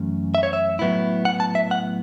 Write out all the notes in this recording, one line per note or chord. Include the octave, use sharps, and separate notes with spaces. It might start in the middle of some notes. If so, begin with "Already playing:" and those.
Already playing: F#2 E3 A3 C#4
E5
C#5
E5
A2 F#3 B3 E4
F#5
A5
E5
F#5